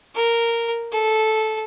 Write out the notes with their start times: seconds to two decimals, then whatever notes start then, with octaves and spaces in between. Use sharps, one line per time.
0.15 A#4
0.92 A4